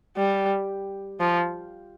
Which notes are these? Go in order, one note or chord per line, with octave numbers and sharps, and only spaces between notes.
G3
F3